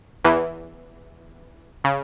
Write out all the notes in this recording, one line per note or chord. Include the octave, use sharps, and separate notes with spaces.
E2 E3
C#3